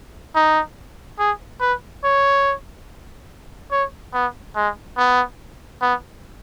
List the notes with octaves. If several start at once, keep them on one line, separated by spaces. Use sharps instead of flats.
D#4
G#4
B4
C#5
C#5
B3
G#3
B3
B3